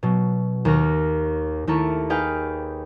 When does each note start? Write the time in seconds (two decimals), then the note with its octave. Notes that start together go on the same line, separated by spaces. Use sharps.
0.03 B2 F#3
0.65 D#2 C#6 F6 A#6
1.67 D#2 A3 E4 A4 A#4 C#6
2.10 D#4 G#4 B4 F5 G5